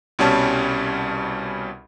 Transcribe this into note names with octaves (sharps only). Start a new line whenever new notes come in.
C2 B2 G3 C#4 A5